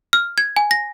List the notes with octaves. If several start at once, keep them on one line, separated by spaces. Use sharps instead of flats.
F6
G#6
G#5
A#6